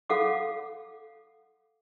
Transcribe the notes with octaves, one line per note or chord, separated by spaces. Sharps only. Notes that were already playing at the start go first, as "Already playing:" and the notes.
A4 F5 F#5 D6